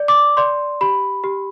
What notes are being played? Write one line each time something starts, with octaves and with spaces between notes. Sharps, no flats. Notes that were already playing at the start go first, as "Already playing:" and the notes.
Already playing: D5
D6
D5 C6
G4 B5
G4